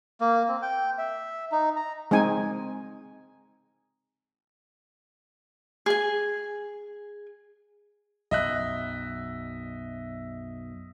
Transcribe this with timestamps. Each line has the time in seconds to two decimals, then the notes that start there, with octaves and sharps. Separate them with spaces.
0.21 A#3
0.48 C4
0.62 G5
0.98 E5
1.52 D#4
1.76 A#5
2.11 G#3 C4 D#4 G#5
5.86 G#4 G#5
8.31 B1 F#2 D#5 E5 F#6